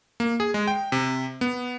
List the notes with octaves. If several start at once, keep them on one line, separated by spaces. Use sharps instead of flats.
A#3
G#4
G#3
G5
C3
B3